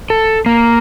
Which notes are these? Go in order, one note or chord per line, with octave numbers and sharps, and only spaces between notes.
A4
A#3